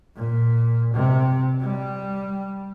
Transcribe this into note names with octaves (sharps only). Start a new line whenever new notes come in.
A#2
C3
G3